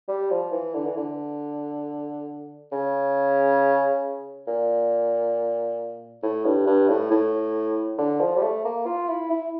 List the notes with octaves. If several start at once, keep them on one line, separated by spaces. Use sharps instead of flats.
G3
F3
E3
D3
E3
D3
C#3
A#2
A2
G2
G2
A2
A2
D3
F3
G3
A3
A#3
F4
E4
E4